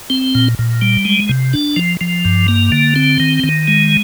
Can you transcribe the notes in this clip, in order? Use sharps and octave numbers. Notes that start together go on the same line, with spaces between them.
C4
A#2
A#2
G3
G#3
C3
D4
F3
F3
G2
A#3
D3
C4
D#3
D#3
G#3